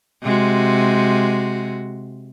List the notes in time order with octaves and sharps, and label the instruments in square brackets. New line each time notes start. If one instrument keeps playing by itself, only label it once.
[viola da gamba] C3 G#3 F#4